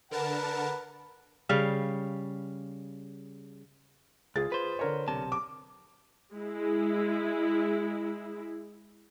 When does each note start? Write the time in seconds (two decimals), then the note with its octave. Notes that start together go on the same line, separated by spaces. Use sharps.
0.11 D3 A#4 B4 F#5 A5
1.49 C#3 G3 F5
4.36 C#2 F4 G#4 A6
4.52 B4 C5
4.79 D3 A#4 C#5
5.08 B1 C3 A5
5.32 D6
6.32 G#3 E4